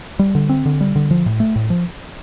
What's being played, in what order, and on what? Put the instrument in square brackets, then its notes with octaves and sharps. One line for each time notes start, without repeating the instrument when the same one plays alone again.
[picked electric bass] G3
D3
C4
D3
G3
D3
F3
A2
A3
A2
F3